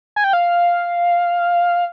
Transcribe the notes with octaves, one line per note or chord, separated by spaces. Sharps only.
G#5
G5
F5